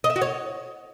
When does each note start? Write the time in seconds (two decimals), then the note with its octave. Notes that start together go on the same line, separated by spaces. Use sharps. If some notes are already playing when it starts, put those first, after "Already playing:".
0.04 D#5
0.10 E5
0.16 F#4
0.22 C#5